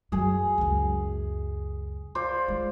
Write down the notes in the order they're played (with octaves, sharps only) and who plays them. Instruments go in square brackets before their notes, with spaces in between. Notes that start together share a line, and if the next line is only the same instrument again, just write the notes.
[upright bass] F#2 F#3 [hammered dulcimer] G#4
[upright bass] C#2 F#2
[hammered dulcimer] F4 C5 D5
[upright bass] G#3